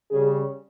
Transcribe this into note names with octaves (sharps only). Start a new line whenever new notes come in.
C#3 G3 C#4 G#4